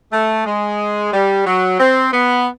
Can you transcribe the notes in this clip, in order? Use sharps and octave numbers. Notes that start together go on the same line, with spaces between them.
A3
G#3
G3
F#3
C4
B3